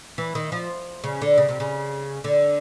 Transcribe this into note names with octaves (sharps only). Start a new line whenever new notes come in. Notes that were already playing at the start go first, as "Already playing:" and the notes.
E3
D#3
F3
C#3
D3
C#3
C3
C#3
D3